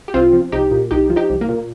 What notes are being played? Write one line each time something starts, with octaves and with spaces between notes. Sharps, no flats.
G4
C2 C4 F4
F3
C2 D#4 G4
A#2
C2 D#4 G4
F3
D#4 G4
C2
A#3
A#2